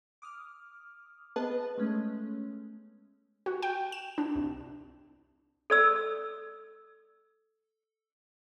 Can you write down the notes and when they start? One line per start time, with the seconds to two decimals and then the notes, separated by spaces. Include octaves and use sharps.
0.22 D6 D#6 F6
1.36 B3 G#4 B4 D#5 A5
1.78 G#3 A3 C#4
3.46 F#4
3.62 G5
3.92 E7
4.18 D4
4.35 C2
5.70 A4 D5 E6